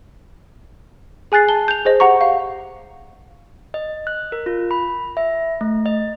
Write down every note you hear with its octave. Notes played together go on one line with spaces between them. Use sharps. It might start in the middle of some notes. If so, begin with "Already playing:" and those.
G#4 G#5 F#6 A6 C7
A5 G7
G6 F7
G#4 C5 D#5
G4 F#5 A#5 C#6
F5
D#5
F#6
A#4
F4
B5
E5
A3
D#5